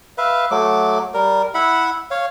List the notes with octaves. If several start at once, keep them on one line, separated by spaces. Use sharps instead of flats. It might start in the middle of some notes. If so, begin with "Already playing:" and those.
B4 E5 F5
F#3 A3 D6
G3 A#4
E4 E5 F#5 B5
C#5 F5